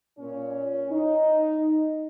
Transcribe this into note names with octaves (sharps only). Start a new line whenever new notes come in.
A#2 C#4
D#4